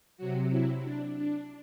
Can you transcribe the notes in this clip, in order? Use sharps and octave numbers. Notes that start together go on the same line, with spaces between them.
C3 F#3 F#4
E4
D4
D4